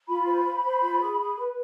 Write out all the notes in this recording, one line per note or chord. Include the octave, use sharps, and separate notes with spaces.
F4 B5
C5
C5
C5
F4
G#4
G#4
B4